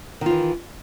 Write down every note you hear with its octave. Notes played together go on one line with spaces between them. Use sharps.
D#3 E3 F4